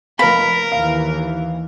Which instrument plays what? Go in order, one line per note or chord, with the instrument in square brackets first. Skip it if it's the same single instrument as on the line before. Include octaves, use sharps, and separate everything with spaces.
[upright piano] F1 B4 F5 [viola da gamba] A#4 [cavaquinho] B5
[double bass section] D#2 E3 [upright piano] F5